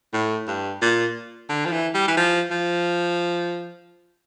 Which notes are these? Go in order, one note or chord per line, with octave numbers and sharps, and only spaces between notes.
A2
G2
A#2
D3
F3
E3
G3
E3
F3
F3